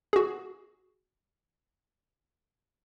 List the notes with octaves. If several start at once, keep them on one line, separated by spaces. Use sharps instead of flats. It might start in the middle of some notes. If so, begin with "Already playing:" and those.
F#4 G#4